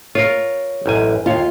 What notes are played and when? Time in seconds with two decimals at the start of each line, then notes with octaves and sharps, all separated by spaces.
0.15 F4 A#4 C#5
0.86 A1 F#2 G#5
1.26 D#2 F4 C#5